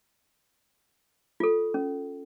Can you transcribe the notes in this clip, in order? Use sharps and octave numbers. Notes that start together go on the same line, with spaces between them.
F4 A4
C#4